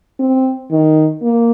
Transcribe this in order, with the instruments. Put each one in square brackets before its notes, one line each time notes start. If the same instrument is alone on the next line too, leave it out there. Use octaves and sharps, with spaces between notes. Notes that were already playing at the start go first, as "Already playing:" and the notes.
[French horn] C4
D#3
A#3